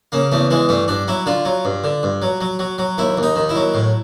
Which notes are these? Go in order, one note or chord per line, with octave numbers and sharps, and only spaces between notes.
C#3 A#3
E2 A3
E3 G#3
G2 A3
G2 D4
F#3 E4
D3 F4
F#3
G2
D3
G2
F#3
F#3
F#3
F#3
D#2 E4
D#2
D#4
D#3
E4
F#3
A2